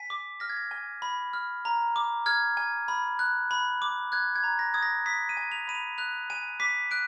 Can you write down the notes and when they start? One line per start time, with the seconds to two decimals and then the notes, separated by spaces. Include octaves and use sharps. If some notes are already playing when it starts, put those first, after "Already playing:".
Already playing: G#5 B6
0.10 D6
0.40 F6 A#6
0.49 G#6
0.57 A#6
0.71 G#5
1.02 B5
1.33 F6
1.65 A#5
1.96 D6
2.26 F6 G#6
2.57 G#5
2.88 B5
3.19 F#6
3.51 B5
3.82 D6
4.12 F#6 G#6
4.35 G#6
4.43 A#5
4.59 A#6
4.74 D#6 G#6
4.83 A#6
5.06 D#6 B6
5.29 D#7
5.37 G#5
5.52 F7
5.68 B5 D#7
5.75 F7
5.98 F#6 F7
6.30 G#5 D#7
6.60 D6 B6
6.91 F#6 D7